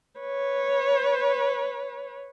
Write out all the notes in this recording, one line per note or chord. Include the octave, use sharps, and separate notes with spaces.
B4 C#5